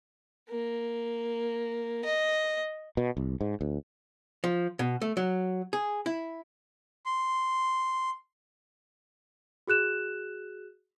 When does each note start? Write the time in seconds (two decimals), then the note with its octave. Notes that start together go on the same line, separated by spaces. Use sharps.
0.49 A#3
2.04 D#5
2.97 B2
3.17 C2
3.41 G#2
3.61 D2
4.44 F3
4.79 B2
5.02 A3
5.17 F#3
5.73 G#4
6.06 E4
7.06 C6
9.67 F#4 G#4 F#6 E7